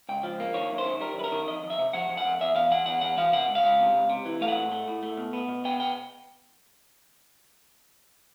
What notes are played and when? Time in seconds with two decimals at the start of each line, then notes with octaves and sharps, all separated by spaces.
0.09 C#2 G5
0.23 F3
0.40 A#3
0.54 D#3 C#5
0.71 F#2
0.78 C5
0.86 D#3
1.01 G3 A#4
1.16 F#2 B4
1.24 A#4
1.32 D#3
1.47 F2 D#5
1.64 F2
1.70 E5
1.79 C3
1.93 F3 F#5
2.09 F2
2.17 F#5
2.24 F2
2.40 E2 E5
2.55 E2 F5
2.71 E3 F#5
2.86 E2 F#5
3.01 E2 F#5
3.17 E3 F5
3.33 C3 F#5
3.48 C#2
3.55 F5
3.64 C#2
3.79 C3
3.95 C#2
4.10 C3
4.25 E3
4.41 A3 F5
4.48 F#5
4.56 A2
4.72 A3
4.88 A2
5.03 A3
5.17 B2
5.33 B3
5.49 B2
5.65 B3 G5
5.80 B2 G5